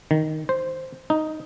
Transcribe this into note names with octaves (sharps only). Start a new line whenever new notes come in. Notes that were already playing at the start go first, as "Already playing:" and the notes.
D#3
C5
D#4